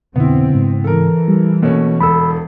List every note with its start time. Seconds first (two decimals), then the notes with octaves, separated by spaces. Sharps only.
0.16 F2 B2 D3 B3 C4 E4
0.50 G#2 C#3
0.84 E3 A4 A#4
1.28 G3
1.63 B2 A3 A#3 C#4
2.01 E1 A4 B5 E6